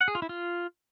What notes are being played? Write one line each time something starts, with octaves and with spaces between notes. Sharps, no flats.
F#5
G#4
F4
E4
F4